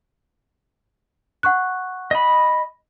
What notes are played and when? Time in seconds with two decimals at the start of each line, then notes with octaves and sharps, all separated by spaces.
1.43 F#5 C#6 F#6
2.11 D#5 B5